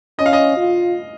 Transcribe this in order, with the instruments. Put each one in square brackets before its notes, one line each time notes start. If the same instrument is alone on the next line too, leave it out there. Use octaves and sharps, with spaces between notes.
[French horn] C#4 [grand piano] D#5
[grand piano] F5
D#5
[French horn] F4